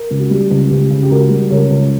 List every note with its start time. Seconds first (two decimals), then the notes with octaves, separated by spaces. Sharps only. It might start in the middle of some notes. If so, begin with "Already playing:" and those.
Already playing: A#4
0.11 C#2
0.20 F#4
0.31 G3 G4
0.51 C#2
0.71 C#2 G4
0.91 C#3
1.03 G4
1.10 C#2 F#4 A#4
1.31 G3
1.51 C#2 A#4 C#5
1.71 C#2